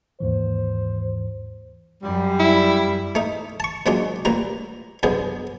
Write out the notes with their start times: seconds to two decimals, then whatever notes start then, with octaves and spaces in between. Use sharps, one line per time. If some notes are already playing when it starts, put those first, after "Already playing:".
0.20 D#2 G#2 E3 C5
2.03 F#2 G3
2.39 E4
3.15 A3 D#4
3.60 A5 C#6
3.86 A#2 F#3 G#3 C#4 D4
4.25 A1 A#2 G3 A#5
5.03 C2 F#2 B2 D3 G#4